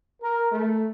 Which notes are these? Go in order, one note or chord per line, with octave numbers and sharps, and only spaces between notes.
A#4
A3